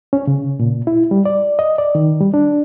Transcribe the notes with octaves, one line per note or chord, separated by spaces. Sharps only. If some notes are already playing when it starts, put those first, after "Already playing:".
C#4
C#3
A#2
E4
G3
D5
D#5
D5
D#3
G3
D4